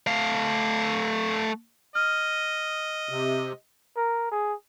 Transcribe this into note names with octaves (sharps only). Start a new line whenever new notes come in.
A3 F5
D#5 F6
C3
A#4
G#4